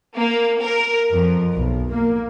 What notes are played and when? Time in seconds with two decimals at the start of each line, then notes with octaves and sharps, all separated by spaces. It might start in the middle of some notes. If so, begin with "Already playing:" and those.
0.16 A#3
0.62 A#4
1.14 F2
1.54 B1
1.90 A#3